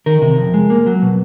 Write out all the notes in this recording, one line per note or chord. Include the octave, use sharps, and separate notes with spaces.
D#3 A#4
C3
F2
G#3
A#3
F#3
B2